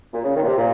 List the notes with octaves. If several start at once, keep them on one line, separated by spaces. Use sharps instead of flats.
A#2
C#3
D#3
A#2
C3
A#2